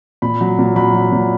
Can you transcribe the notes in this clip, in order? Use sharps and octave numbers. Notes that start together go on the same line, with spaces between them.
A#2 B5
F#3
A#2
F#3 B5
F#3
A#2